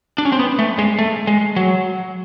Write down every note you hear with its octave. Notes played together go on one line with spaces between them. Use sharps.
D4
C#4
C4
B3
A3
G#3
A3
G#3
F#3